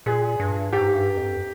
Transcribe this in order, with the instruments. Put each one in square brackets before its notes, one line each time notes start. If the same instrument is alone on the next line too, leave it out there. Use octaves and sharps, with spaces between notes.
[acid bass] A#2 [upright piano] G#4
[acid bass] G2
[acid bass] G#2 [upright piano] G4
[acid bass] G2
F2